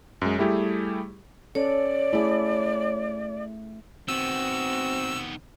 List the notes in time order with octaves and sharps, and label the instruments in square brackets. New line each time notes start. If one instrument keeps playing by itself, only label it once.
[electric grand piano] F#2 G#3
G3 A3 E4 G4 G#4
[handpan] C#4 A4 [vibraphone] C#5 [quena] D5
[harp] A3 [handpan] E4 G#4
[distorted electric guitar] D#3 B3 [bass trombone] C4 [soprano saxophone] F#4 [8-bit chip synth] E6